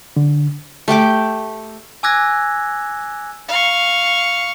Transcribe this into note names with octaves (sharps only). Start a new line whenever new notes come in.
D3
A3 G4 G5 D6
G#5 D6 E6 F#6 G#6 A#6
F5 C#6